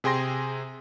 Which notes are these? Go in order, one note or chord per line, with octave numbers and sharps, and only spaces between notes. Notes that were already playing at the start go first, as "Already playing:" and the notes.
C3 G#4 G5 C6 A#6